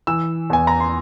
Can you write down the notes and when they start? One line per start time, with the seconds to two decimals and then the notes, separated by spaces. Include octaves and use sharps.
0.07 E3 E6
0.50 E2 G#5
0.67 A#5
0.80 C6